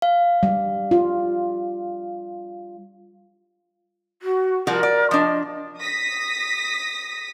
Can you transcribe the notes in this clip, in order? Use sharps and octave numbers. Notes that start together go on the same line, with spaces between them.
F5
G3
F4
F#4
F3 G3 F#4 A#4
D5
F3 D4 D#5
D#6 A#6 B6